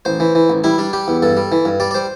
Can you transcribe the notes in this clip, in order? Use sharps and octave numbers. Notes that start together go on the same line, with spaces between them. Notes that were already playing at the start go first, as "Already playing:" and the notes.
A1 C5
E3
E3
A1
G3 E4
G3 D4
G3 G4
E2
G2 A4
G3
E3
G2
G3 D5
D5
G3 C5